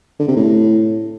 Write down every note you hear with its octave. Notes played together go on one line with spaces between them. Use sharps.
D3
C3
A2